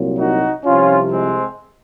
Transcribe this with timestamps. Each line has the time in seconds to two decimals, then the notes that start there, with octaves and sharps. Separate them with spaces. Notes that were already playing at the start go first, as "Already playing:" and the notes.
Already playing: C2 A#2 F#3
0.17 D#4 F#4
0.64 C2 C3 F3 C#4 F4
1.12 G#3 C4